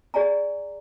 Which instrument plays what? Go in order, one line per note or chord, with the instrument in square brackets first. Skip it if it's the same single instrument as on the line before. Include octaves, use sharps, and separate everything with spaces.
[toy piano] G#4 D5 G#5 A#5